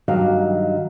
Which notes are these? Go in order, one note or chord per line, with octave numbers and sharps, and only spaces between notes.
G2 D#3 F#3 F5